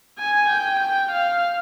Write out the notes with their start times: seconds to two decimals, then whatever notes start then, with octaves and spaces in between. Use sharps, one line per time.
0.19 G#5
0.49 G5
0.79 G5
1.11 F5